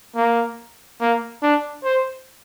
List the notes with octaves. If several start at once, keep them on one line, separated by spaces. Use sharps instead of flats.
A#3
A#3
D4
C5